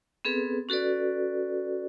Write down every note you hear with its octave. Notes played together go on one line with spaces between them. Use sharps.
B3 C4 G#4 A4 B4
C#4 F#4 A4 B4 D5